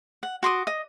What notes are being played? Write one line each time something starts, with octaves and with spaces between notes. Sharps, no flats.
F#5
F#4 C6 D6 D#6
D#5